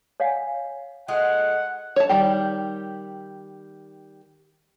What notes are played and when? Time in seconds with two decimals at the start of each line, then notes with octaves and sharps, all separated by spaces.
0.20 C#5 D#5 F5 F#5 G#5
1.08 G#3 A3 F4 F#5
1.96 C#5 A5
2.09 D#3 G3 G4